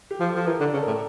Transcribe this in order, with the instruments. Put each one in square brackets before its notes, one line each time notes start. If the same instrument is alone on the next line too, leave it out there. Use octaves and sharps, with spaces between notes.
[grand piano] G4
[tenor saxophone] F3
[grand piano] A4
[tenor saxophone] F3
[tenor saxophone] E3 [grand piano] A#4
[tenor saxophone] D3
[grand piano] D5
[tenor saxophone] C#3
[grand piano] A4
A#4
[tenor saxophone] A2